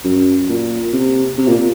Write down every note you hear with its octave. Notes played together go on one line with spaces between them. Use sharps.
F#2
A#2
C3
C3
A#2